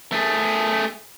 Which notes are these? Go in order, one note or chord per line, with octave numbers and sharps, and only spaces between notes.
A3 G#4